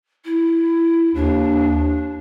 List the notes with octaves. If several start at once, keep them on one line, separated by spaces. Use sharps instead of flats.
E4
D#2 D4